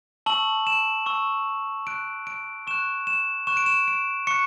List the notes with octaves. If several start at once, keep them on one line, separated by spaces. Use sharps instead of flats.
A5 C#6 E6 F#7
E7
A5 C#6 E6
C#6 F#6 D7
D7
C#6 F#6 E7
E7
C#6 F#6 E7
D7
E7
D7
C#6 F#6 C#7